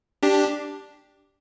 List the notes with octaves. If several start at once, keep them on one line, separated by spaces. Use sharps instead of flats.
D4 G4